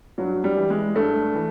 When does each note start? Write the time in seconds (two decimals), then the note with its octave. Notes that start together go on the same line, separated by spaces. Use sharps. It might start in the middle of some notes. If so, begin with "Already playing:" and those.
0.18 G2 F#3
0.44 G3
0.57 E3
0.70 G#3
0.95 G2 A3
1.35 E3